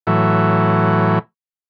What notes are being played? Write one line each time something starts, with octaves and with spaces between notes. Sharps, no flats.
A2 E3 F#3